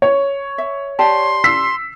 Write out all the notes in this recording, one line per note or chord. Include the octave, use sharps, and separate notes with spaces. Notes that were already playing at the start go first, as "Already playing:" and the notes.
C#5
E5
G4 D5 A5 C6
E6 B6 C7